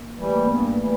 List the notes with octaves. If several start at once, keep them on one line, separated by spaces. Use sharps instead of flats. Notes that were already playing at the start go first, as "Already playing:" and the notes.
Already playing: A#3
E3 G3 A3
A#3
G2 B3
A#3
E3 G3 A3